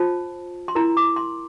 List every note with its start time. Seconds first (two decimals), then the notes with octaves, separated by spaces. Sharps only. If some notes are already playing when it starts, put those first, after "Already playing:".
Already playing: F4 C5 A5
0.68 C6
0.75 E4 A#4 A#5
0.97 D6
1.16 C6